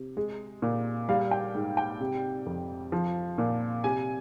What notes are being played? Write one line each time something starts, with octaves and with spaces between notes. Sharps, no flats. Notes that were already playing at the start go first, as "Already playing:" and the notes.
Already playing: C3
G#3
A#2
G3 F5
G5
G#2
G5
C3
F2
F3
A#2
C3 G#5